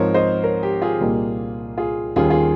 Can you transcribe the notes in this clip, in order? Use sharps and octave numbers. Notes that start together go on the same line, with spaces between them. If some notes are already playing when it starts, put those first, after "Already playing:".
Already playing: G#2 F3 C4 D#4 A#4 C#5
C5 D#5
A#4 C#5
G4
F4 G#4
C2 A#2 G3 A#3 D#4
F4 G#4
D#2 D#3 G3 C#4 F4 G#4
F4 G#4